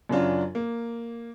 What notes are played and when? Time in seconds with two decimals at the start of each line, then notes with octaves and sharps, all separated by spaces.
0.09 F#2 C#3 F#3 D4 F4
0.55 A#3